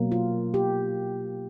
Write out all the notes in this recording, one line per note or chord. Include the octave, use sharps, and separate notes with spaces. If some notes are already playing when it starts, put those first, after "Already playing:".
Already playing: B2 F#3 A#3
F4
G4